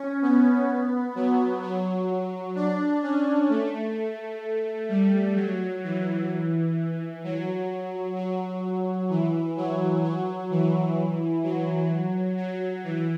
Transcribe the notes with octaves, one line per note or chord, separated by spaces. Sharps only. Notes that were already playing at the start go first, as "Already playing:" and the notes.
Already playing: C#4
B3
F#3
F#3
D4
C#4
A3
G3
F#3
E3
F#3
F#3
E3
F#3
F#3
E3
F#3
F#3
E3